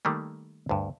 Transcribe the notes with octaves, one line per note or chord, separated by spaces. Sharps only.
D#3 G3 A3 A#3
D2 G2